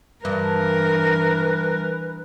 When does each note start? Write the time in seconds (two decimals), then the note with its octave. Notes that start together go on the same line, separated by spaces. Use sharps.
0.25 G2 E3 A#4 B4